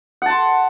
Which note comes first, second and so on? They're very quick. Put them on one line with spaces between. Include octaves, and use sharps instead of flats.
F#5 A5 C6